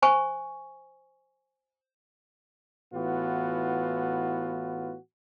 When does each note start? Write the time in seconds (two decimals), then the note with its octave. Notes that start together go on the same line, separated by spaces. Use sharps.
0.02 C5 G#5 C#6
2.93 A2 E3 B3 F4 F#4